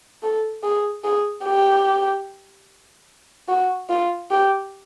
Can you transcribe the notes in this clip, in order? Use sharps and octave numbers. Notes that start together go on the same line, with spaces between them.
A4
G#4
G#4
G4
F#4
F4
G4